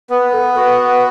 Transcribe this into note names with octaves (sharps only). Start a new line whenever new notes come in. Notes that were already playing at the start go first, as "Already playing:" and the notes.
B3 B4
A4
F#4 B4